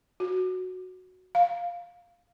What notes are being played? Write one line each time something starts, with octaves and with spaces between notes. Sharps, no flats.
F#4
F5